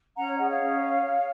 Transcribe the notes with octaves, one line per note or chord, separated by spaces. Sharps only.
C#4 F#5 A#5
C#5
G#4 D#5 F#5
C#5 F5
C#4
C#5
C#5